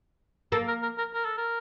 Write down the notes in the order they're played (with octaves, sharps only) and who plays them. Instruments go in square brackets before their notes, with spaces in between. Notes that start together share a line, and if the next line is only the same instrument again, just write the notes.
[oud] A#3 [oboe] A4
[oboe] A#4
A#4
A#4
A#4
A4
A#4